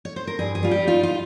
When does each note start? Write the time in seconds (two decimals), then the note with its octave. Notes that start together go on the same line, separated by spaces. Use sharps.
0.05 C#5
0.16 C5
0.27 A#4
0.39 G2 G#4
0.55 G#4
0.63 G3 F4
0.71 G4
0.87 D#4 F4
1.03 F4